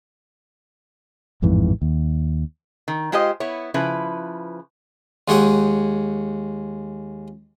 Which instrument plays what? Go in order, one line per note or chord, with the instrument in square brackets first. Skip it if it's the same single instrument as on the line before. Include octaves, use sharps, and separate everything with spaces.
[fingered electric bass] A1 F2 G#2 E3
D#2
[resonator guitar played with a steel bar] D#3
G#3 F4 G4 C5 D#5
B3 E4 C#5
C#3 F3 E4 B4
[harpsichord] D#2 G#3 C#5 F#5 G5 D#6